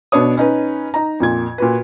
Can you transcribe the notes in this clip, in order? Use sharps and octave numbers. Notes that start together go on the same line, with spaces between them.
B2 B3 D4 B4 C#5 D#6
C#4 D#4 B4
D#4 A#5
F2 A#2 G#6
A#2 F#4 B4